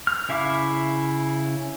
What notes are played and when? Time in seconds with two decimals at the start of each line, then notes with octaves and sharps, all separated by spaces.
0.07 F6
0.29 C#3 E4 E5 F5 D6